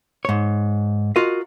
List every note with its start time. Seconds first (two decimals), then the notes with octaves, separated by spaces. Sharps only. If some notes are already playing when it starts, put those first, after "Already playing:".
0.25 G#2 C#5
1.16 F4 F#4 A#4 D#5